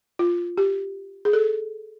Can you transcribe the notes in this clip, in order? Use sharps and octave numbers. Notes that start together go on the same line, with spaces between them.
F4
G4
G#4
A4